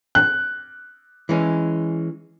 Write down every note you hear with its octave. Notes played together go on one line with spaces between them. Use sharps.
F#6
E3 G#3 C#4